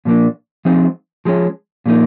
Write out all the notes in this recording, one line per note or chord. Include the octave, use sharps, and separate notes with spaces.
A#2 F3 A#3 D4
F3 G#3 C4 D#4
F3 G#3 C#4
A#2 F3 A#3 D#4